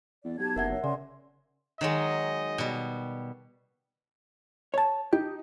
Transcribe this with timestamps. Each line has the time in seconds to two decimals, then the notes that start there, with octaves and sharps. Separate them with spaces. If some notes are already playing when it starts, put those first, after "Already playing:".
0.24 E2 D5
0.38 B1 G4 A5 G#6
0.56 F#1 A#4 E5 F#5
0.70 C#5
0.84 C#3 D5 G#5 C6
1.81 D#3 F#3 G#3 D#5
2.58 B2 G3
4.74 C#5 A5
5.13 D#4 G4